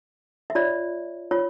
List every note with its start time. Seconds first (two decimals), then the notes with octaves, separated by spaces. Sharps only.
0.50 E5
0.55 F4 C#5 D5
1.31 F4 C#5